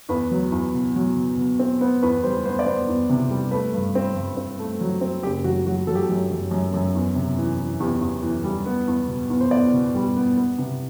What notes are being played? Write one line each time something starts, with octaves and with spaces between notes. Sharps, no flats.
E2 B4
F#3
E2
B2
F#3
B2
B2
C4
B3 C5
E2 B4
G3 C5
B3 C5
D5
B3 C5
E2
C3
G3
A3 B4
G2
C4
G2
C4
A3
F#3
C4
F#1 G4
F#3 F#4
F#3 F#4
F#3 A4
G4
A4
F#2
F#2
F#2
F#2
E2
C3
E3
E3
E2 G4
E2
E3
G3
B3
E2
B2
E2
C5
B3 D5
B2
G3
B3
B3
C3